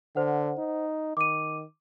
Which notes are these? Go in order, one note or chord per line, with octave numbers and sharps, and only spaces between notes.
D3 C5 F#5
D#4
D#3 D6 D#7